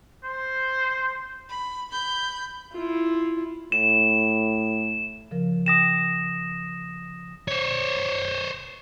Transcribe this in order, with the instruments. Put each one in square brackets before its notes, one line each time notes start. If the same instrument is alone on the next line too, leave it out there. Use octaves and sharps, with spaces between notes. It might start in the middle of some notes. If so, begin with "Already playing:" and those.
[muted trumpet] C5
[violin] B5
B5 G6
[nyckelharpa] E4 F4
[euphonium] A2 [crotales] E7
[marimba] C#3 F3 A#4
[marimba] G5 [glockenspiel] D#6 A#6 E7
[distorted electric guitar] C5 C#5